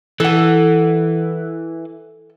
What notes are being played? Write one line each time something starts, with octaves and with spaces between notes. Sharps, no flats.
E3 A4 F#5